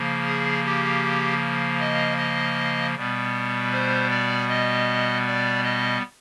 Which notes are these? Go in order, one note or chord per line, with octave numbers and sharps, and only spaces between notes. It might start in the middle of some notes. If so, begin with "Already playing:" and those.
Already playing: C#3 F3 A#3
G#4
G4
D#5
D#5
B2 G3 B3
C5
D5
D#5
D5
D#5